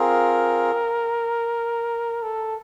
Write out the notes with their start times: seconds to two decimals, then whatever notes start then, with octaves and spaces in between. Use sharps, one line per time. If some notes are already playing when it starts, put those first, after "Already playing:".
Already playing: C4 F4 G#4 A#4
2.23 A4